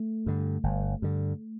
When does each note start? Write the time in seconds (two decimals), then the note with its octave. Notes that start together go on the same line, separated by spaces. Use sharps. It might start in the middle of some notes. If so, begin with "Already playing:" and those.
Already playing: A3
0.26 G2 D3
0.63 G1
1.02 G2 D3